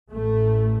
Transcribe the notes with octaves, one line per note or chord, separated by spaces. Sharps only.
A1 A2 A3